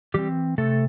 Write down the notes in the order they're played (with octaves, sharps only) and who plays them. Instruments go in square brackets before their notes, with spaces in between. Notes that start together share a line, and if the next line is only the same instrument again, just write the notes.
[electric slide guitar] E3 G3 C4 G4
C3 A3 A4